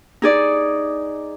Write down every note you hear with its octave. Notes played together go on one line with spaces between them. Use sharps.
D#4 G#4 D5